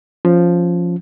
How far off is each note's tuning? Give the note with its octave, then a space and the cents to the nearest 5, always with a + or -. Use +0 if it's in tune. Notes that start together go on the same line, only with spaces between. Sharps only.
F3 +0 C#4 +0